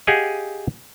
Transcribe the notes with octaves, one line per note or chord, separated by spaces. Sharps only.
G4 G#4 D#5 F5 F#5 G#5